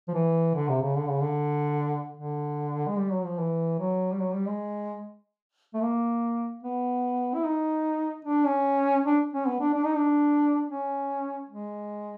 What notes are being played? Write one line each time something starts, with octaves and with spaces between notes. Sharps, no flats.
F3
E3
D3
C3
C#3
D3
C#3
D3
D3
G#3
G3
F#3
F3
E3
F#3
G3
F#3
G3
G#3
A3
A#3
B3
E4
D#4
D4
C#4
D4
C#4
B3
D4
D4
D#4
D4
C#4
G#3